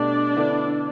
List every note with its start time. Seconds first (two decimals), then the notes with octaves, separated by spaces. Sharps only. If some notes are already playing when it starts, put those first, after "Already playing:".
Already playing: B2 A3 D4 G4 D5
0.36 D3 B3 E4 A4